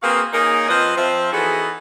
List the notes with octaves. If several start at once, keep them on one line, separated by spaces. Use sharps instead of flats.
A#3 C4 F#4 G#4 B4 F5
A#3 C#4 D#4 G#4 A#4
F3 C4 B4 D#5
F3 C4 E5
E3 B3 D#4 F#4 G#4 A4